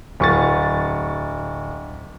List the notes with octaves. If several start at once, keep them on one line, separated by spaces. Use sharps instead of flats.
D1 C#6 A6